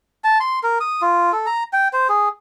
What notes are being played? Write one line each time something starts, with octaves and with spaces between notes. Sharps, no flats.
A5
C6
A#4
D#6
F4
A4
A#5
G5
C5
G#4